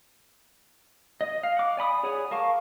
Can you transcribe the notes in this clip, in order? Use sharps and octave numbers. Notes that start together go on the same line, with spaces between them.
D#5
F5
F#5 D6
D5 G#5 B5 D#6
G#4 C#5 D5 F#5 G#5
A#4 F5 A5 C#6 D6